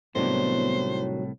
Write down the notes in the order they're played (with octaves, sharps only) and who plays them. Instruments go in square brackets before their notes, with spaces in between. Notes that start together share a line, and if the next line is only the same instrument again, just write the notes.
[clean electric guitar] C2 A2 [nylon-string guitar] D#3 F#3 D4 [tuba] B3 [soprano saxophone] C5